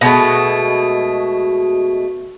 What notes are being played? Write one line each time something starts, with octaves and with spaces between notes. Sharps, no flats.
B2 G#3 A3